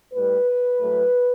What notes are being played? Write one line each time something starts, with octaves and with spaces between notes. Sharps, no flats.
A2 G3 B4
A2 F#3 A3